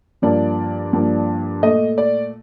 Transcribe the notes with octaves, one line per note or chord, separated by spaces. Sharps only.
G2 F3 A#3 D5
G2 F3 A#3
A#2 A3 D#5
D5